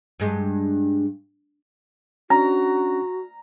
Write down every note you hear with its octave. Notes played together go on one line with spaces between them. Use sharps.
G2 G#3
C#4 D4 F#4 A#5